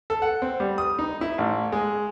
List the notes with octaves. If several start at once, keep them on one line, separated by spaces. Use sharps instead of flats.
A4
F#5
C4
G3
D#6
D#4
E4
A1
G#3